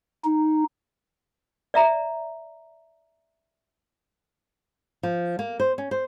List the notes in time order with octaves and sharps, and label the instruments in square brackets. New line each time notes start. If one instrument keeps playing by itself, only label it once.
[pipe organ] D#4
[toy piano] D5 E5 A#5
[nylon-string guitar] F3
A#3
C5
C#4
C5